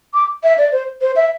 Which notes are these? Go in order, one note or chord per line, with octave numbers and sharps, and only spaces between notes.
D6
E5
D5
C5
C5
E5